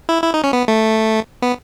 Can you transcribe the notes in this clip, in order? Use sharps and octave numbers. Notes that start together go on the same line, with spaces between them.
E4
E4
D#4
C#4
B3
A3
B3